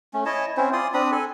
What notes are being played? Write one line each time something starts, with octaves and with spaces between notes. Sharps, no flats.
A3 C#4
E4 C#5 D#5 A5
C4 C#4 E4 C5
F4 D5 C6 D#6
C4 D4 B5 D#6
A4 G#5